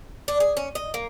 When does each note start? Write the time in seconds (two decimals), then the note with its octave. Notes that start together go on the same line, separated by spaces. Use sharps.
0.28 D4
0.40 G#4
0.57 C#4
0.75 D#5
0.94 A#3